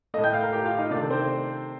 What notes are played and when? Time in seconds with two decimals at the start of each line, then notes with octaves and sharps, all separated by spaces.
0.14 A2 A3 D#5 D#6
0.24 G5 G6
0.33 F5 F6
0.42 A#4 A#5
0.53 G4 G5
0.65 F4 F5
0.78 D#4 D#5
0.91 C3 D#3 A3 D4 D5
1.10 C4 C5